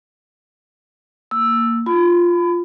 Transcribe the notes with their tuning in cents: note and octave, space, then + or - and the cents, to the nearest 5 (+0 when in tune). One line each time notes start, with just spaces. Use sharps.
A#3 -10 E6 +0
F4 +0 B5 +30